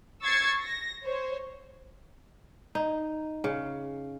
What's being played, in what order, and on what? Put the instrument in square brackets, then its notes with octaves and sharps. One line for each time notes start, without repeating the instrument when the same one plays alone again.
[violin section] C#6 E6 G#6 A6 C7 C#7
A#6
C5 C#5
[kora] D#4
C#3